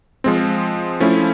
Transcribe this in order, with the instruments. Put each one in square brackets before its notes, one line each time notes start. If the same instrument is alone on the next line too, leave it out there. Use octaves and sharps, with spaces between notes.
[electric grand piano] F3 G#3 C4
F3 A3 C#4 E4